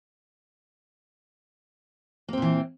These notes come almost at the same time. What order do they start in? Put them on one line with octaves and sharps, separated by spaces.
A#3 C4 A#2 E3